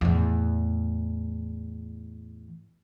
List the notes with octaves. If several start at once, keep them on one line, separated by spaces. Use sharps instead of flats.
E2 A2